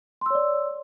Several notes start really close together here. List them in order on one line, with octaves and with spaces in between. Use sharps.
C6 E6 C#5 D5